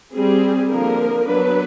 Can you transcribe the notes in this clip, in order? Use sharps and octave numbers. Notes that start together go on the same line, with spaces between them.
G3 C4 G#4
D3 F3 A#3 A#4
F#3 B3 D4 B4